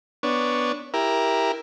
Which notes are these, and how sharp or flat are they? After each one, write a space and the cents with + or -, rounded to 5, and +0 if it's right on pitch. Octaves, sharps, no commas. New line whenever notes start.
B3 +0 D4 +0 C#5 +0
E4 +0 G4 +15 A#4 +10